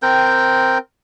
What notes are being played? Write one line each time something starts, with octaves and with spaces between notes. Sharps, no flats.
C4 A#4 G5